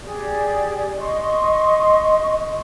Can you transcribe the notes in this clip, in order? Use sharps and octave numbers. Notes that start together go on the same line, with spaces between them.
G4 G#4 D5
D#5 C6 C#6